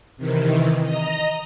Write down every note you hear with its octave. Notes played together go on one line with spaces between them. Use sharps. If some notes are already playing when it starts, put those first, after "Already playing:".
C3 D#3 E3
D#5 A#5